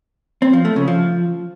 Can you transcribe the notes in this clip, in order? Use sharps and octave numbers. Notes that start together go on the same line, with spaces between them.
C4
F3
A3
C#3
F3